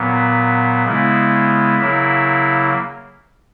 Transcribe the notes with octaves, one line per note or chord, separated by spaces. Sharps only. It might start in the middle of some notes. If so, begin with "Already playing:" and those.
Already playing: A#2 F#3 B3
C#3 G#3 B3 E4
C#3 F#3 A#3 E4